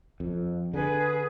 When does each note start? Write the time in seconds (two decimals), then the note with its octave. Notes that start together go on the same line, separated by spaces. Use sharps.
0.20 F2
0.74 D3 G#4 B4